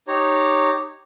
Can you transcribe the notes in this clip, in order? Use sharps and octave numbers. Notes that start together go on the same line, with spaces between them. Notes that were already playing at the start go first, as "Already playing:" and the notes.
D#4 G4 C#5 A#5